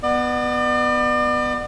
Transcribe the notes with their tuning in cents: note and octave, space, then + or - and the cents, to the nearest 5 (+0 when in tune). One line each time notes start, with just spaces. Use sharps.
B3 +0 D5 +40